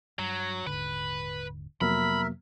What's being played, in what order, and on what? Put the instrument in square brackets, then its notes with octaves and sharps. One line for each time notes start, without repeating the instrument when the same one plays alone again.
[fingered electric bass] G2 [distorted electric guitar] F#3
[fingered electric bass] D#1 G#2 D3 [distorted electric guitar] B4
[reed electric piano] F2 F#3 A#3 [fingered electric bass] C3 B3 [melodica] A#4 E5 [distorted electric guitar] B5